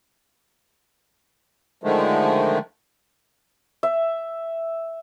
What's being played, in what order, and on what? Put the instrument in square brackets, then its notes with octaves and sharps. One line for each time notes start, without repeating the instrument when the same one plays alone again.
[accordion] D3 D#3 F3 G#3 A3
[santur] E5